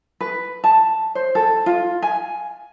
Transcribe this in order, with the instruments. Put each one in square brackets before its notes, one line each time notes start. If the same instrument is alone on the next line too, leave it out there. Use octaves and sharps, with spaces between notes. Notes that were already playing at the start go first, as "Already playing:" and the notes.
[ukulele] B4
A5
C5
A4
F4
G#5